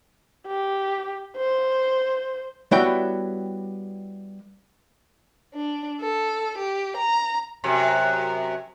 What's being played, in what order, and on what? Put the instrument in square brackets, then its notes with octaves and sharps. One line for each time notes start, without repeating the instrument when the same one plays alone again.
[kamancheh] G4
C5
[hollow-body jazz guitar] G3 B3 E4 F#4 C#5 G5
[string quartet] D4
A4
G4
A#5
[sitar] F#2 C3 F#3